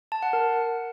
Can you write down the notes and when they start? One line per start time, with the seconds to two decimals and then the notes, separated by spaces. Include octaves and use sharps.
0.12 A5
0.23 F#5
0.33 A#4